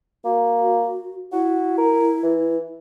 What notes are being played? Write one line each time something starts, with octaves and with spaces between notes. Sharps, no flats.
A#3 F#4
E4 F#4
A#4
E3